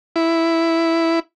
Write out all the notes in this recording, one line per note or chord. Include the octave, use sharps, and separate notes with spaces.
E4